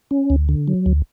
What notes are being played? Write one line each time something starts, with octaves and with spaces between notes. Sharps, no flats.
C#4
D2
D3
F#3
D2